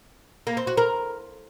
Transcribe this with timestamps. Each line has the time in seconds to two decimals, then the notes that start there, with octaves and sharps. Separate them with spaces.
0.47 A#3
0.57 C4
0.67 F#4
0.77 A#4